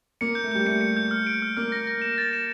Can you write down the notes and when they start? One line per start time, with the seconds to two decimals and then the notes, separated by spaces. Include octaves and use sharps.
0.21 A#3 C#7
0.35 G6
0.44 A3
0.51 G3 G6
0.65 A3 C#7
0.81 C#7
0.97 G6
1.11 F6
1.27 D7
1.42 F6
1.57 A#3 F6
1.72 A#6
1.87 A#6
2.02 E7
2.18 A6
2.33 E7